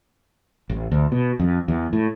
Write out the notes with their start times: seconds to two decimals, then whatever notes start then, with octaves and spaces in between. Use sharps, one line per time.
0.70 A1
0.92 D2
1.12 B2
1.39 F2
1.68 E2
1.93 A2